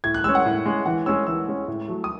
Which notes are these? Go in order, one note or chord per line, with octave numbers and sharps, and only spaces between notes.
A2 G#6
F#6
G#3 C#4 E6
F#5
A2
G#3 C#4
E3 F#5
G#3 C#4 E6
E3 E6
G#3 C#4
A2
F#3 A3
D#6